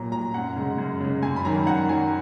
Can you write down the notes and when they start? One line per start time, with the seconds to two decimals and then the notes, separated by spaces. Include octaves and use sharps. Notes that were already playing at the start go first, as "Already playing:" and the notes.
Already playing: A#2 F#3 A#5
0.12 F#3 A#5
0.34 F#2 F#5
0.56 C#3 G#3
0.78 F#2
1.01 C#3 G#3
1.23 F#2 G#5
1.36 B5
1.45 D#3 F#3 A#5
1.67 F#2 F#5
1.89 D#3 F#3 G#5